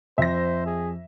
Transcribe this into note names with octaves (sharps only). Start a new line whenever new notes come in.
F2 C5 E5 A#6
G#4